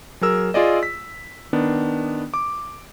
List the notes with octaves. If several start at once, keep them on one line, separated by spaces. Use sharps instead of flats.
F#3 G#4 A#4 E6
F4 G#4 D5 D#5
B6
D#3 B3 D4
D6